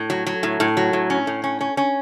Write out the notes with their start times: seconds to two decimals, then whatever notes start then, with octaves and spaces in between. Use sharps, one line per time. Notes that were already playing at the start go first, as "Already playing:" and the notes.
Already playing: A2
0.10 F#3
0.27 F#3
0.43 A2
0.60 A2
0.77 F#3
0.93 A2
1.10 C#4
1.27 A2
1.44 C#4
1.61 C#4
1.77 C#4